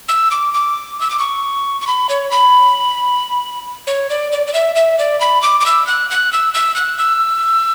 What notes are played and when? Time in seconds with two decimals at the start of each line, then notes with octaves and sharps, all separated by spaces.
0.09 E6
0.31 D6
0.54 D6
1.00 E6
1.10 D6
1.19 C#6
1.81 C#6
1.87 B5
2.09 C#5
2.31 B5
3.87 C#5
4.10 D5
4.32 D5
4.47 D5
4.54 E5
4.76 E5
4.99 D5
5.21 B5
5.42 D6
5.60 D6
5.66 E6
5.87 F#6
6.10 F#6
6.33 E6
6.54 E6
6.76 F#6
6.98 E6